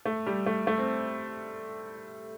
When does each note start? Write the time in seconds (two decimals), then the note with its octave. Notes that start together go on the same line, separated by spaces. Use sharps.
0.05 A3
0.27 G3
0.46 A3
0.67 A3
0.78 C4